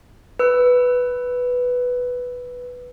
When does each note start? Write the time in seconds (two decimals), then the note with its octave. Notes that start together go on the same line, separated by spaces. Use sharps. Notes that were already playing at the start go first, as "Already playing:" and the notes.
0.39 B4 E6